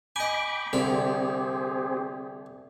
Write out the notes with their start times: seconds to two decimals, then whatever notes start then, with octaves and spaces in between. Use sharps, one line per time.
0.16 D#5 G5 G#5 B5 D6
0.73 C2 D3 C4 G4 G#4 B5